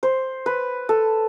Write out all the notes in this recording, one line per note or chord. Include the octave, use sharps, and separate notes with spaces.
C5
B4
A4